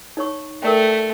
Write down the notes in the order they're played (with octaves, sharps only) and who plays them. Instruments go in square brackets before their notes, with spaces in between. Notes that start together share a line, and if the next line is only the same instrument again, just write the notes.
[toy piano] D#4 C#5 C#6
[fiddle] A3 [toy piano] A#4 D5 G5